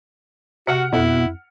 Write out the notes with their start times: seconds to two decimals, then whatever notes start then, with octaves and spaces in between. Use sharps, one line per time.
0.67 C3 F#4 F#5 F6 C#7
0.93 F2 B2 E4